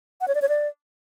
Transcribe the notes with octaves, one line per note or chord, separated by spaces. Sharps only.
F#5
C#5
D5
C#5
D5